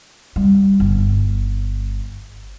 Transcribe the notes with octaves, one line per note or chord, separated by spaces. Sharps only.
G3
G1